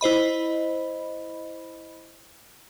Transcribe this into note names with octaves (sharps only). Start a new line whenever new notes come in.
E4 C5 D#5 B5